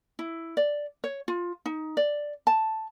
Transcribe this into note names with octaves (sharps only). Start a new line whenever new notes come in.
E4
D5
C#5
F4
D#4
D5
A5